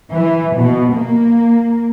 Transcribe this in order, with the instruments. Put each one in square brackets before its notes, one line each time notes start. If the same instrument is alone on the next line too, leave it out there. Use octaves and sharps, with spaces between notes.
[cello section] E3
B2
A#3